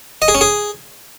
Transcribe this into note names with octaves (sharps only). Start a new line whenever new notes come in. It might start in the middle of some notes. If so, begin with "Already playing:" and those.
D#5
G#4
C#4
G#4